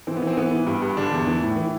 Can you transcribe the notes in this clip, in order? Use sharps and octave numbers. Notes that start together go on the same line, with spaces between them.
E3 C4
B3
E3
C4
E3 B3
E3
G2
G2
D3 D4
E2
E3
A2
E3